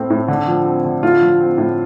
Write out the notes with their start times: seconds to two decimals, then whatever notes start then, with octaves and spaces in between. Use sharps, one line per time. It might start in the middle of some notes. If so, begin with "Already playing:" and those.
Already playing: A2 A3 C4
0.10 A2
0.28 D3
0.47 F3
0.65 C4
0.85 D3
1.03 A2 F4
1.22 F3
1.40 C4
1.58 A2